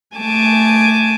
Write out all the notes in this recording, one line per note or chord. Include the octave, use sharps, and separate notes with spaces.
A3 G#5 A5 D6